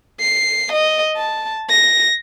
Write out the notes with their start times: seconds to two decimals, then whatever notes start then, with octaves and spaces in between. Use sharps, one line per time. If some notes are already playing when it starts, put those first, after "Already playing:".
0.20 C7
0.72 D#5
1.16 A5
1.70 A#6